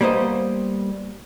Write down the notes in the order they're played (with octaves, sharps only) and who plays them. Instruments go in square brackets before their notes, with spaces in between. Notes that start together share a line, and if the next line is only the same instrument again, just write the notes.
[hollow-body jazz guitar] G3 A#3 B3 C5 D#5